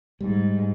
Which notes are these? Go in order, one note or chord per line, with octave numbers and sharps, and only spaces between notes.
G#2 G3